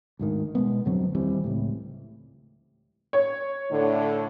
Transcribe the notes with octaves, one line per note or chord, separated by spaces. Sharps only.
D2 G#2 D#3
B2 G#3 B3
F2 D3 F#3 C4
D#2 E3 G3 C4
C#2 A2
C#5
A2 D3